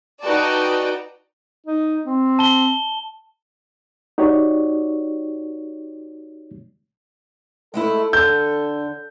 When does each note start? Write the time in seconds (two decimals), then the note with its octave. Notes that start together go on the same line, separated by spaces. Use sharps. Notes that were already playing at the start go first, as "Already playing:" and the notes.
0.23 D#4 F#4 B4 D5 G5 A5
1.66 D#4
2.06 C4
2.39 A5 G7
4.18 D#4 F#4 G4 C#5 D5
7.74 G#3 A3 E4 A4
8.13 D3 G6